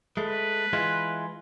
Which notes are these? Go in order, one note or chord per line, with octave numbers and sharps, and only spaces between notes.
G#3 A3 B4
E3 G#3 F4